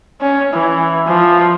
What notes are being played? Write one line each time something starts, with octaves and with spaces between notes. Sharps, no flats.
C#4
E3
F3